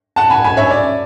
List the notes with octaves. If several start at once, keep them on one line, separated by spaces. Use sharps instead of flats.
F#5 A5
G#5 B5
G#5 B5
C#5 E5
D5